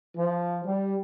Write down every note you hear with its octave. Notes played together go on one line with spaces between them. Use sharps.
F3
G3